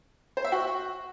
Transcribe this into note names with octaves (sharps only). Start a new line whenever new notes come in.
C5
E5
F#4